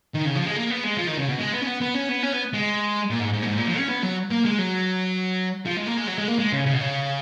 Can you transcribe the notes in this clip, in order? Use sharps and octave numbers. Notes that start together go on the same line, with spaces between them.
D#3
C#3
F3
G#3
A#3
B3
G#3
F3
D#3
C#3
B2
G#3
B3
C#4
B3
B3
C#4
B3
C#4
B3
G#3
A#2
G#2
G#2
A#2
G#2
A#2
F3
C#4
B3
F#3
A#3
G#3
F#3
F3
G#3
A#3
G#3
F#3
G#3
A#3
G#3
C#3
C#3
B2
C#3